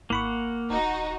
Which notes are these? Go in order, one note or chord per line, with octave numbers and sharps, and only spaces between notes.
G#1 A#3 F#5 B5 C#6
D#1 D#4 F#4